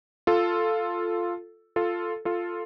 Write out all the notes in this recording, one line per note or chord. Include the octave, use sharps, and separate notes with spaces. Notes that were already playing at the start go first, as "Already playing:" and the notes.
F4 A4
F4 A4
F4 A4